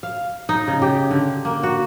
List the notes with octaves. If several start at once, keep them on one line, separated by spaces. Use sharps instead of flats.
F5
D#4
C#3
G4
D3
A#3
F#4